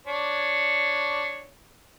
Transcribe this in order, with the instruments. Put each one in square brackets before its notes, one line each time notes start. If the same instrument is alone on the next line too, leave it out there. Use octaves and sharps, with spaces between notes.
[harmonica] D4 C#5